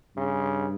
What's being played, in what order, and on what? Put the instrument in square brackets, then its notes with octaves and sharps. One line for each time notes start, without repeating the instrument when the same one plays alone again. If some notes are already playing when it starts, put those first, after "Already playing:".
[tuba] G2 [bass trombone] C#3